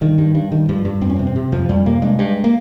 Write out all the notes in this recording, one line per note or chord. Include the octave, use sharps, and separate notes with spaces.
G2 D#3
G2
G2
G2 D#3
G2 F3
G2
F2 C4
C#4
C4
C3
C4
C3
F2 F3
F2 G3
C3 A#3
G2 G#3
G2
A#3